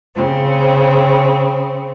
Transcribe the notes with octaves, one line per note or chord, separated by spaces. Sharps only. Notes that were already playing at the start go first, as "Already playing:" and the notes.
C#3 C4